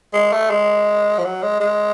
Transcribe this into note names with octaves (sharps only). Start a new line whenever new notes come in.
G#3
A3
G#3
F3
F#3
G#3
G#3